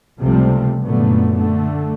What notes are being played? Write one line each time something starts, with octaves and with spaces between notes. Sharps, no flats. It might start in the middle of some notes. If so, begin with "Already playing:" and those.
C#2 C3 F3 G3 A3 C4
F#2 A#2 D3 A3 B3
D3 A3